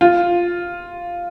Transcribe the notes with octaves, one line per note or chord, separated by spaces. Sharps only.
F4